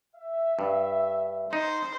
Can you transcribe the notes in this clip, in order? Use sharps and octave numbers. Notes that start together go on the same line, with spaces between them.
E5
G2
D#4 C5